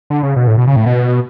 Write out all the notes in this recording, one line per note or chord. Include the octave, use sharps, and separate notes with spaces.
D3
C#3
B2
A2
B2
C#3
A2
B2